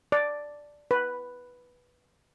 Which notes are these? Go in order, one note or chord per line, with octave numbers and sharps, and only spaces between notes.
D5
B4